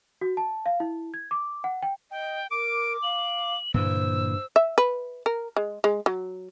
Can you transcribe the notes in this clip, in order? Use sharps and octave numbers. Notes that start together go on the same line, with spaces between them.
F#4
A5
F5
E4
G#6
D6
F#5
G5
D#5 G5
A#4 D6 D7
F5 F#7
G2 A#2 D3 E3 C5 E6
E5
B4
A#4
G#3
G#3
F#3